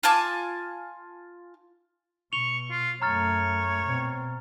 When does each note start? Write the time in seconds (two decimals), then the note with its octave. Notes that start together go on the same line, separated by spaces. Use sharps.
0.03 F4 G#5 A5 D6
2.33 B2 C#6 F7 G7
2.71 F4
3.02 F#2 A3 C#5 A#5 F6 A6
3.84 B2 C4